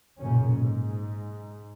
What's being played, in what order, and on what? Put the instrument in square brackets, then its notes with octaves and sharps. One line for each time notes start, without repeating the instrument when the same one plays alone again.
[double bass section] B1 F#2 A#2 C#3 C#4
G#2